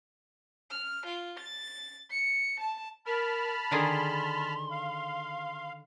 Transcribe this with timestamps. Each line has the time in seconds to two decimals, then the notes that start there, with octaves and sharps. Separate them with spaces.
0.71 F6
1.06 F4
1.40 A6
2.11 C#7
2.60 A5
3.06 A#4 A5 B5 F6
3.71 D3 D#3 G#4 C6
4.71 F5